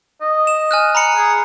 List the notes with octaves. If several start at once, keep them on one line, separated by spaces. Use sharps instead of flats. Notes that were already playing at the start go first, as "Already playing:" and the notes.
D#5
E7
G#5 F6 F#6
A#5 B5 C#7
G#4